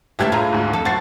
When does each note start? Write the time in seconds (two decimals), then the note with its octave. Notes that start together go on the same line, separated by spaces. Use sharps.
0.19 G1 D2 A3 G4 E5 G#6
0.32 A2 F4 G#4 A#5
0.53 D2 G#2
0.73 F2 A4
0.85 F#1 F#4 A6 C7